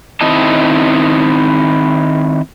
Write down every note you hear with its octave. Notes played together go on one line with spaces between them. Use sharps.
D#3 C4 E4 D#5 A5